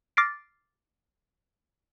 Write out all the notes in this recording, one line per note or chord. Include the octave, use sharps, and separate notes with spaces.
D6 F6 A6 A#6 C7 D7